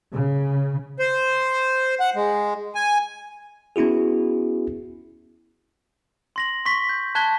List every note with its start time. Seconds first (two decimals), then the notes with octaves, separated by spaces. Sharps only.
0.13 C#3
0.99 C5
2.00 F#5
2.15 G#3
2.75 G#5
3.76 B3 C#4 E4 F#4 G#4
6.36 C6 A#6 F#7
6.65 C6 C#6 B6
6.89 G6
7.15 A5 F#6 G#6 B6 G7